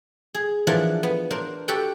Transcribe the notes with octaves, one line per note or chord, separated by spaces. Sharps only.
G#4
E3 F3 D4 F4 A#4 F#5
B3
D4 A#4 C5
F#4 G4 A4 F#5 G5